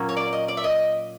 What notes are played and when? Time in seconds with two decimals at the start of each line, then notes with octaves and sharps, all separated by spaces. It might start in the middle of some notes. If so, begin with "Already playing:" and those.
Already playing: A#2 F#3 A#3 C#4
0.09 C#5
0.17 D5
0.33 D#5
0.48 D5
0.57 E5
0.64 D#5